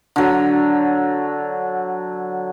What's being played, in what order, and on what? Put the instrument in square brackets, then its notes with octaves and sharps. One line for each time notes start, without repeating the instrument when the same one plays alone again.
[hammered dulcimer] D3 F#3